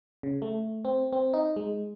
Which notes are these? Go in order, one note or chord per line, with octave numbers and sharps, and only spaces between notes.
C#3
A3
C4
C4
D#4
G#3